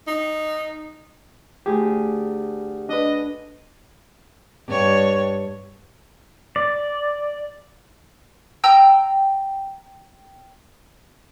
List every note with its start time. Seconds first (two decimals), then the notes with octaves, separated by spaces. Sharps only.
0.07 D#4
1.66 D2 G4 G#4
2.89 D4 B4 D#5
4.66 G2 C#5
6.56 D5
8.64 G5 A#5 E6